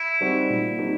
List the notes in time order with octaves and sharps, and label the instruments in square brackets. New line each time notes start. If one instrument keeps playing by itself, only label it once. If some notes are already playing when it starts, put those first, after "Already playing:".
Already playing: [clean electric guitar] E4
[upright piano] G3 C4 D#4 F#4
A#2
G3 C4 D#4 F#4